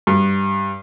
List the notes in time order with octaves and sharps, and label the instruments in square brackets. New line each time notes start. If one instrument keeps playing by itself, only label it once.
[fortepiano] G2